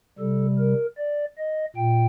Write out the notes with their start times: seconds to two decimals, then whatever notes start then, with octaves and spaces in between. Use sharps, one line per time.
0.19 C3 G3 A4
0.58 A#4
0.98 D5
1.37 D#5
1.76 A#2 G5